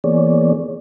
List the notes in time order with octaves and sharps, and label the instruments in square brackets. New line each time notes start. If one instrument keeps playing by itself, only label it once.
[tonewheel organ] E3 A#3 B3 G#4 C#5 D5